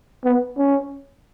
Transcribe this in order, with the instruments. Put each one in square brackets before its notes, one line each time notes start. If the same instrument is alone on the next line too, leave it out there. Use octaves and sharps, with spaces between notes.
[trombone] B3
C#4